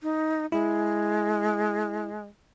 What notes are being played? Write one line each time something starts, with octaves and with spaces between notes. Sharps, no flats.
D#4
G#3 E4